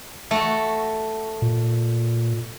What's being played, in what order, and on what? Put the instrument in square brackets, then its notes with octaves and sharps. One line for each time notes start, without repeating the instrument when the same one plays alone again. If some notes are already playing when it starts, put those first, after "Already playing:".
[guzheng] A3 F#4
[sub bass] A#2